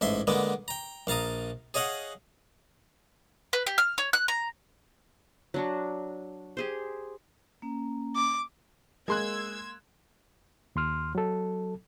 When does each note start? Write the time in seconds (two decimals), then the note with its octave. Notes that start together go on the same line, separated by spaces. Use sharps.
0.01 A1 G#2 E5 C6
0.27 D3 G#3 A#3 B3
0.68 G5 A#5
1.07 A#1 F5 A5 A#5 D#6
1.74 G#4 C#5 D#5 F5 F#5
3.53 B4
3.67 G4
3.78 F6
3.98 C#5
4.13 F#6
4.28 A#5
5.54 F#3 D4 F#4
6.57 G4 G#4 C5
7.62 A#3 C#4 A#5
8.16 D6
9.08 G#3 A#3 C6 E6 F#6 G#6
10.76 D#2 C6 F6
11.15 F#3 A4